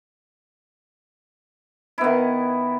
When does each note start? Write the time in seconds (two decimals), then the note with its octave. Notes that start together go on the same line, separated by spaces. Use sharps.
1.98 E4
2.01 B3
2.04 D#3